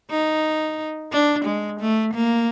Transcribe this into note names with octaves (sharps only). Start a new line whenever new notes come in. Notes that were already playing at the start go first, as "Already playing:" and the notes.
D#4
D4
G#3
A3
A#3